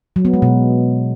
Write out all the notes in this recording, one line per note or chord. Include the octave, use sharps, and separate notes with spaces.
F#3
B3
G#3
B2